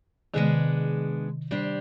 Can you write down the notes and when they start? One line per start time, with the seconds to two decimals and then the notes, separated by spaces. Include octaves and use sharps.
0.34 C3 D#3 G#3 B3 D4 G#4
1.51 G3 D4 G4 C5